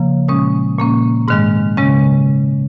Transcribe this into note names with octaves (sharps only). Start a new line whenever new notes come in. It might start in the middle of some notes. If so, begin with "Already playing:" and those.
Already playing: C#3 F3 A#3
A#2 G#3 C#4 D#6
A#2 A#3 C#4
G#2 D#3 G#3 F6
C#3 G#3 C#4